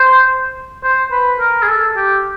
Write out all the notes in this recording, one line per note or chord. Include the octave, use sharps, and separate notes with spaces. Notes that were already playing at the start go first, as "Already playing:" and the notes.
Already playing: C5
C5
B4
A#4
G#4
A4
G4